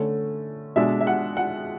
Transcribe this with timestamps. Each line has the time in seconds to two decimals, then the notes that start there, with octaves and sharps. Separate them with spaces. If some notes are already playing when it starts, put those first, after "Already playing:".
Already playing: D3 A3 C#4
0.76 B2 G#3 D4 E5
1.01 E5
1.07 F#5
1.37 F#5